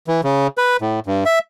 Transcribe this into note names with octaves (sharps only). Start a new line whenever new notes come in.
E3
C#3
B4
A2
G2
E5